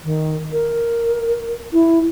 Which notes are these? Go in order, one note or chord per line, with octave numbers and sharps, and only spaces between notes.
D#3
A#4
E4